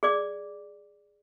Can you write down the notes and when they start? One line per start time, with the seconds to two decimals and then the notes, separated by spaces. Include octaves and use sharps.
0.03 G#4 D5 D6